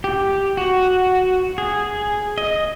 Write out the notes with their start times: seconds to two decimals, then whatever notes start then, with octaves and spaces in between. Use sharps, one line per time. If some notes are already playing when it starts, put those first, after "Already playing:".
0.04 G4
0.57 F#4
1.58 G#4
2.38 D#5